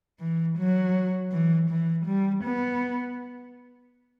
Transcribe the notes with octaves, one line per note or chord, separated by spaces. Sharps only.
E3
F#3
E3
E3
G3
B3